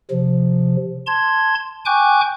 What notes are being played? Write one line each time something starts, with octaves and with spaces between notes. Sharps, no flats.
C3 F3
A5 C6 G#6
G5 G#5 C#6 D6 F#6 G6